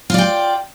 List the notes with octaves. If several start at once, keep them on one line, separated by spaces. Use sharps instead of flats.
F4 D5 G5